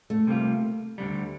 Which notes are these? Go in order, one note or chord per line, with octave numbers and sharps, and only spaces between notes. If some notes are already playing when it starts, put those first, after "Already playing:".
A3
C3 G3 A#3 F4
D2 D3 G3